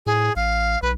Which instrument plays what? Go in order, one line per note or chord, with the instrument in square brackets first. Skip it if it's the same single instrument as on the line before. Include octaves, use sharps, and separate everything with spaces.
[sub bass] A2 [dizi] G#4
[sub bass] A1 [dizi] F5
[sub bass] B1 [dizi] B4